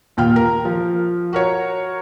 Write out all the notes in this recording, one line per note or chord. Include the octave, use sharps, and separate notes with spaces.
D#2 A#2 G5 F6
A#4
F3
F#4 A#4 C#5